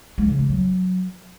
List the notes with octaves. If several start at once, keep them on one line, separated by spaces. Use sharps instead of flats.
G#3
C#3
E3
F#3